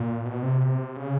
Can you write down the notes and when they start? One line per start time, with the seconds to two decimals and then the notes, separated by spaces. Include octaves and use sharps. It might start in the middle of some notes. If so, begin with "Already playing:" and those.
Already playing: A#2
0.25 B2
0.43 C3
0.96 C#3